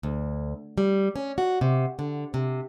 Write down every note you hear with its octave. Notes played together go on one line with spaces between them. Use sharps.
D2
G3
C#4
F#4
C3
D3
C3